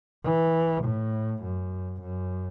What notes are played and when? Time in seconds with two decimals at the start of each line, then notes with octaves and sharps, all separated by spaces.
0.24 E3
0.84 A2
1.43 F#2
2.01 F#2